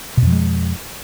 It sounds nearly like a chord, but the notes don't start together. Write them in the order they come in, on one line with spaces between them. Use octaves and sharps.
B2 F2 F3 G#3